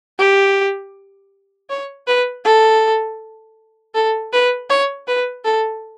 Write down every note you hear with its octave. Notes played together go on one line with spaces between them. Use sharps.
G4
C#5
B4
A4
A4
B4
C#5
B4
A4